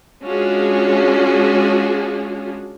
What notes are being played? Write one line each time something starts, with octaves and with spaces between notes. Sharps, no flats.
G#3 C#4 D4 F4 F#4 G#4